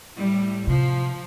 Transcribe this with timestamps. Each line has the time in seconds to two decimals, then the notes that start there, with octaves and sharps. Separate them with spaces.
0.17 A2 G3
0.67 C3 F3